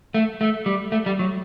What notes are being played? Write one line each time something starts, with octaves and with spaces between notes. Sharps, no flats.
A3
A3
G3
A3
G3
F#3